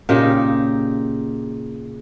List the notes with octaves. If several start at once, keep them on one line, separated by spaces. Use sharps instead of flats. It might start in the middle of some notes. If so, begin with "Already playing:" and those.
A#2 C#3 D#4 G4